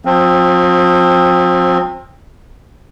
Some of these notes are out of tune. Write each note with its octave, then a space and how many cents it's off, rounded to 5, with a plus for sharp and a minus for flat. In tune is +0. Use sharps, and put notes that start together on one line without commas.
F3 +40 C4 +20